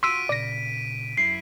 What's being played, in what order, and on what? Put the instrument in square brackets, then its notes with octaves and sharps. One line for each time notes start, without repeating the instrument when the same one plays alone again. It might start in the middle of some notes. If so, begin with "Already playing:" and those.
[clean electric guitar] F4 F#4 [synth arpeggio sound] C6 E6 [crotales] B6 D7 D#7
[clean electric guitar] A#2 C#3 [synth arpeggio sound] D5 A#6
[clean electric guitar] F#2 E4 [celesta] C7